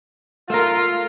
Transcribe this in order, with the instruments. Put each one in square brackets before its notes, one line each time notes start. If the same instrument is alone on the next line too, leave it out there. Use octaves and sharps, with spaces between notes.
[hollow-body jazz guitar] A3 A#4 [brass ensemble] F4